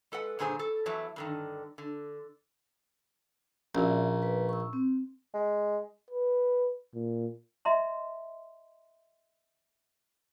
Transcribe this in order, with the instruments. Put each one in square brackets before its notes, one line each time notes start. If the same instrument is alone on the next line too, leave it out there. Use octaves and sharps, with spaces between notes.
[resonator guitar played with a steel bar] G#3 A4 B4 F#5
G2 A#2 D3 G#4 C5
A4
E2 E3 F#3 E5 A5
G2 D3 D#3
D3
[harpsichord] A#1 [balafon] C#4 F#4 [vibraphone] D5 E5
[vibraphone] B4
C#6 E6
C4
[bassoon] G#3
[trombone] B4
A#2
[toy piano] D#5 E5 A#5 C6